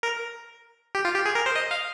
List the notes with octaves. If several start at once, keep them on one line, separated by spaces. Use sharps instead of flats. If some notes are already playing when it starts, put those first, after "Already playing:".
A#4
G4
F4
G4
G#4
A#4
C5
D#5
F5